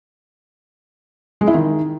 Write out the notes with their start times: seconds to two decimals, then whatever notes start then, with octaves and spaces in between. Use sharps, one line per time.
1.41 G#3
1.47 E4
1.54 D#3